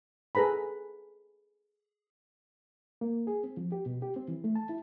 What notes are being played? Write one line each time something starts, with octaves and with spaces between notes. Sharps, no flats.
G#4 A4 B4 A#5 B5
A#3
G#4
C4
F3
G4
B2
G4
C4
E3
A3
A5
E4